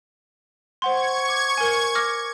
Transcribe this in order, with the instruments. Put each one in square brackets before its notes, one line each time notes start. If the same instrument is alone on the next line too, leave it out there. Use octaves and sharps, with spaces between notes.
[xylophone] C5 F#5 C6 [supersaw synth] C#6 G#6
[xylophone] D6
A#4 G#5
D6 F6 A#6